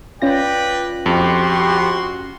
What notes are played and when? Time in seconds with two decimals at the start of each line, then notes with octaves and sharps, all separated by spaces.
0.22 C#4 F4 B4 D5 G5 A#6
1.06 F2 F#4 G4 C6